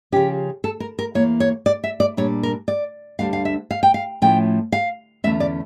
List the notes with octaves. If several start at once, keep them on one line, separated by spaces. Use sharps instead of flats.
C#3 F3 C#4 G4
A4
A#4
A#4
E2 E3 A#3 C#5
C#5
D5
E5
D5
A#2 G3 D4 C#5
A#4
D5
D2 D3 G3 D4 F5
F5
E5
F5
G5
F5
A2 F3 A3 C#4 G5
F5
E2 D3 A3 C#4 E5
D5